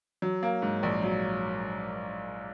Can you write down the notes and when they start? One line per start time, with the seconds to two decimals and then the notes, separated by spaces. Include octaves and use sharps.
0.22 F#3
0.43 A#3
0.62 G#2
0.83 A#1
1.03 F#3